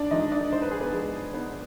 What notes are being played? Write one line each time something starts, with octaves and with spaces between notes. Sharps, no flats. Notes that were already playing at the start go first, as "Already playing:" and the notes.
Already playing: G#2 D4 D5
F3 G#3 D#4 D#5
D4 D5
G#2 C5
B4
G#4
B3 B4
F3 G#3 G#4
G#2 B3 B4